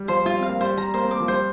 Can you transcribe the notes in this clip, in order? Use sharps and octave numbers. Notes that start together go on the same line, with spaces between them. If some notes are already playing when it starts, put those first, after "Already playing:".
Already playing: G3
F3 C5
G3 F4
C4
F5
A#3
G3 C5
G3 A#5
A#3 C5
C4
A#3 D6
F3
G3 C5